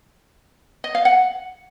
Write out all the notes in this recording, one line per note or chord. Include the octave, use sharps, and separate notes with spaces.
D#5
F5
F#5